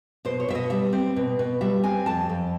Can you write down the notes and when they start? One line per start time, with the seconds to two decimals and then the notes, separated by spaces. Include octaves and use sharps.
0.25 B2 C5
0.40 C#5
0.48 B2 E5
0.55 D#5
0.70 G3 E5
0.93 C4
1.16 B2
1.39 B2
1.61 G3 E5
1.84 C4 G#5
2.06 F2 A5
2.29 F2